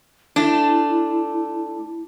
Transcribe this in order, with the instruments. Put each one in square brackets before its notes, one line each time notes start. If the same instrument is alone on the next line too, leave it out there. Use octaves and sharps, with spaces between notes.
[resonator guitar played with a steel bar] A3 D4 [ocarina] E4